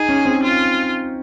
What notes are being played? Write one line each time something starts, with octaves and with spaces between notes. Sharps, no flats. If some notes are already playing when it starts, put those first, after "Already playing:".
Already playing: D#4 G#4
C#4
C4
F4